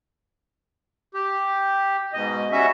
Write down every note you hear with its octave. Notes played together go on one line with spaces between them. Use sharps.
G4
G#2 B2 D#5
G3 C#4 F#4 E5